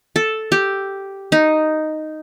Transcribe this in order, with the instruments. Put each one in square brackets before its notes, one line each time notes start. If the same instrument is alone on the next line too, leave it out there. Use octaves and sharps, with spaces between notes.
[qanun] A4
G4
D#4